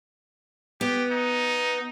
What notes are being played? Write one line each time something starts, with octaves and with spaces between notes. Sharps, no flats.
B3 G4
D#4